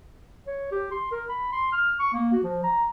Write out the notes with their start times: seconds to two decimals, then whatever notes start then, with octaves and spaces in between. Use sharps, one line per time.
0.47 C#5
0.71 G4
0.91 C6
1.11 A#4
1.29 B5
1.52 C6
1.72 F6
2.00 C#6
2.13 A#3
2.33 F#4
2.44 F3
2.63 A#5